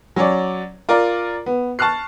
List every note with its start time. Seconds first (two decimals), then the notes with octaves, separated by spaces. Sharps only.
0.16 F#3 C#4 C#5 D5
0.89 F4 A#4 D5
1.46 B3
1.79 A5 C#6 F6 F#6 C7